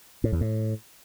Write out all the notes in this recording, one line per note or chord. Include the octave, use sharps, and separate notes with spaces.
A2
E2
A2